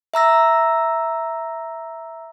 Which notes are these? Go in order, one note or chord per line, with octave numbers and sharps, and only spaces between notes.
E5 A#5 E6 A#6